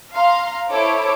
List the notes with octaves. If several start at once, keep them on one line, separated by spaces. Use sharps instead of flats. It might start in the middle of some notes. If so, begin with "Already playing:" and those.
F5 A#5 C6
E4 A4 C5 C#5 D6